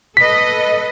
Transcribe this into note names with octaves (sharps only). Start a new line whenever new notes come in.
A4 B4 D#5 B6